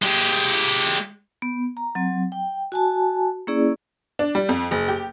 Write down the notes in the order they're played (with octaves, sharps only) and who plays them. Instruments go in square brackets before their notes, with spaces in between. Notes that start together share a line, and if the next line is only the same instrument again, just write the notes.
[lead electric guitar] G#3 G4
[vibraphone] B3
A#5
F#3 C4
G5
F#4 G#5 A5
A#3 C#4 E4 G#4 D5
[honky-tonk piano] D4
G3
F2
F#1
G4